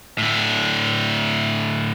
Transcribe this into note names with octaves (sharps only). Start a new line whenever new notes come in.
A2 D3